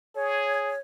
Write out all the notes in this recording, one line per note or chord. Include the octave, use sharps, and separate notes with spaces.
G#4 C#5